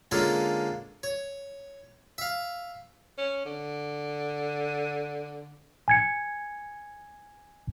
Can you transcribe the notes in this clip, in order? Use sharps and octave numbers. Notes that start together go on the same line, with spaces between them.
D3 G#3 A#3 C#4 F4 A4
C#5
E5 F5
C#4
D3
G#5 G#6 C#7